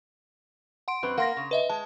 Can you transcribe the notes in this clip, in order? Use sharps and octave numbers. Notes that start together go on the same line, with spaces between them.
F#5 C6 D7
F#2 C4 B4
A#3 F#5 C6 A#6
C#3
B4 D#5 E5
G#3 A5